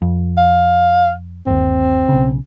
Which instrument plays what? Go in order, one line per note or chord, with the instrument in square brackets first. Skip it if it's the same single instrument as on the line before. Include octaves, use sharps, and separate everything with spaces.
[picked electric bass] F2
[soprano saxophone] F5
[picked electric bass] G1 D#2 [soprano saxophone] C4
[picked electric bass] B1 C#3